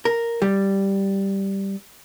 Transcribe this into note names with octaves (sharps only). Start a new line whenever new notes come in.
A#4
G3